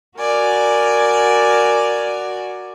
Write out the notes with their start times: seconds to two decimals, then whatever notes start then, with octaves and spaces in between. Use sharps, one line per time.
0.17 F#4 A#4 D5 G#5